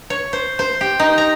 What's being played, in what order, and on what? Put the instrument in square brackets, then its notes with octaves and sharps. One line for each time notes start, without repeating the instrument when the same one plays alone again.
[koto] C#5
C5
C5
G4
D#4
A#5